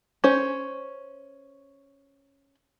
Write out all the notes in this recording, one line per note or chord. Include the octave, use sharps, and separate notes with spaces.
C#4 C5